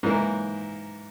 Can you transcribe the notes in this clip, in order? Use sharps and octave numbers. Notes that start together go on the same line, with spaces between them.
G#2 E3 A#3